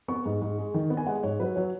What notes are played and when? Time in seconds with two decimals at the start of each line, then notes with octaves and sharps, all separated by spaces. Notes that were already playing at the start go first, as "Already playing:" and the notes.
0.08 B3 C#6
0.25 G#2
0.42 G#2
0.58 G#3
0.74 D#3
0.90 B3
0.97 G#5
1.07 G#3 F#5
1.23 G#2 C#5
1.40 F#3 B4
1.56 F#3 C#5